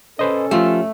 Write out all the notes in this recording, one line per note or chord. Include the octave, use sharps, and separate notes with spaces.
C#4 A4 B4 C5 D#5
F3 A3 F4 G4